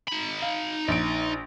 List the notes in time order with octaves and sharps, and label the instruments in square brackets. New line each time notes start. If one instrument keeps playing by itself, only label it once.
[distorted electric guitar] D#4 B5
[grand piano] F5
A#1 D7